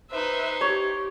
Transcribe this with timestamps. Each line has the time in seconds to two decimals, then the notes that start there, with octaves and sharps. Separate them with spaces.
0.11 D#4 B4 C5 E5
0.61 G4 C#5